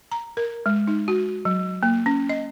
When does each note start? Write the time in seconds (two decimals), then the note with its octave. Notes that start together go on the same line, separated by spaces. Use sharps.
0.12 A#5
0.37 A#4
0.66 G#3
0.87 D#4
1.08 F#4
1.45 F#3
1.83 A#3
2.06 C#4
2.29 D#5